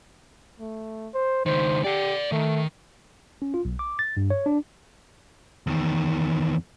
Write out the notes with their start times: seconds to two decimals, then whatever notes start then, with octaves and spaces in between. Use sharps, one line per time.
0.60 A3
1.14 C5
1.46 C#2 D#3 C5
1.84 G4 D5 F#5
2.32 D#3 A3
3.42 C#4
3.54 F4
3.65 B1
3.79 D6
3.99 A6
4.17 G2
4.30 C#5
4.46 D4
5.67 E2 D#3